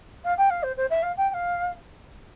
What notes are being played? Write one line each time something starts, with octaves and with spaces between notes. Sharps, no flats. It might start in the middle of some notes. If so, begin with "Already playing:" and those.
F5
G5
F5
C5
C5
E5
F5
G5
G5
F5